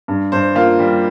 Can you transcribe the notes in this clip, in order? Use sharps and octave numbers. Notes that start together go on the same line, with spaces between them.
G2
G2 C5
A#3 F4
G3